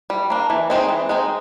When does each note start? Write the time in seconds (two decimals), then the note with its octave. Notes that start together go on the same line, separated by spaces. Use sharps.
0.10 G3
0.30 A#3 D4
0.50 E3
0.70 G#3 C4 D#4
0.89 E3
1.09 G#3 C4 D#4